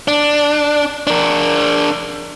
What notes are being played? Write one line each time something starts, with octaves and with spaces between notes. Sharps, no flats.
D4
D4 A#4